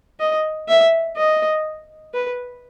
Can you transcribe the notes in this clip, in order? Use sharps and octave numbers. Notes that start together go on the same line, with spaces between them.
D#5
E5
D#5
B4